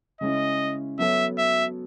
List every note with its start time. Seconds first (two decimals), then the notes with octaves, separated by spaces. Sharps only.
0.21 C#3 G#3 C#4 E4 D#5
0.99 F#3 B3 F#4 A4 C#5 E5
1.38 E5